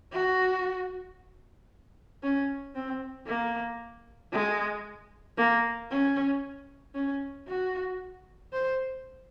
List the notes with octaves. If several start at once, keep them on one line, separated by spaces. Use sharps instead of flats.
F#4
C#4
C4
A#3
G#3
A#3
C#4
C#4
F#4
C5